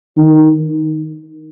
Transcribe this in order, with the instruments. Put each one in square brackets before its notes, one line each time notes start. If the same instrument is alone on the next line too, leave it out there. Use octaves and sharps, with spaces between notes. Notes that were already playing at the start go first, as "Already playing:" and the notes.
[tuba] D#3